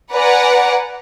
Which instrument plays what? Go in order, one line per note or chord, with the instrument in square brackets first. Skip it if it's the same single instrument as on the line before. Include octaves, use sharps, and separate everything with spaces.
[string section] B4 D5 F#5 G#5 A#5